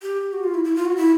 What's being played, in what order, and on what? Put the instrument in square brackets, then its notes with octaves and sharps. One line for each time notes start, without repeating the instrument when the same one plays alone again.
[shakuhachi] G4
F#4
F4
E4
E4
F4
F#4
E4